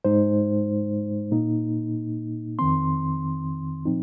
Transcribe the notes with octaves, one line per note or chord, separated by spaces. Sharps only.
G#2 G#3 D#4 C5
A#2 A#3 D#4
F2 D#3 C4 C6
A#2 F3 C4 D#4